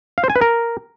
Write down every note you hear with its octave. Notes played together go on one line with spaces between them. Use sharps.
F5
C5
G#5
B4
A#4